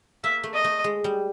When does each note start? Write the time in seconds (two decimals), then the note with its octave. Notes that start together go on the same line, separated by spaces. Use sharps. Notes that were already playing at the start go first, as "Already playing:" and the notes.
0.24 A#3 E5
0.43 A3
0.54 D#5
0.64 A3
0.84 G#3
1.04 G3